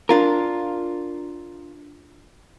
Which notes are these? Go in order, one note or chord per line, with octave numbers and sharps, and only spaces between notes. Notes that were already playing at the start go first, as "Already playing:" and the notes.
D4 F4 A#4